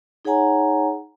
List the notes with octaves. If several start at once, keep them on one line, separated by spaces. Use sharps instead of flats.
D#4 G#4 C#5 F#5 G#5 A#5